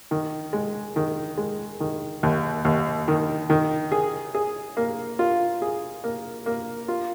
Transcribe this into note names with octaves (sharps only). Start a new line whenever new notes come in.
D#3
G#3
D#3
G#3
D#3
D#2
D#2
D#3
D#3
G#4
G#4
A#3
F4
G#4
A#3
A#3
F4